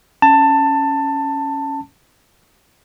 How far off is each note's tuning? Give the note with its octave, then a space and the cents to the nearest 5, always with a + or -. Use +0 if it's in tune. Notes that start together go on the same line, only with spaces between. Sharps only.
C#4 +0 A5 +15